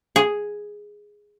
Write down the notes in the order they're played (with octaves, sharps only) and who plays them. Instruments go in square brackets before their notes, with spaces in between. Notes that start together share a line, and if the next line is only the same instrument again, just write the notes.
[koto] G#4